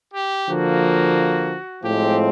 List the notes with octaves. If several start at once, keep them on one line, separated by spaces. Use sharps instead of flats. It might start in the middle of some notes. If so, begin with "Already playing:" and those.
G4
D3 F3 A#3 F#4
A2 F3 G#3 C4 G4